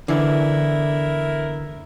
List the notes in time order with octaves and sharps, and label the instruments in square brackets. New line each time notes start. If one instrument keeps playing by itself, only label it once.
[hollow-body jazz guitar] D3 E3 [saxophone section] B3 E4 A#4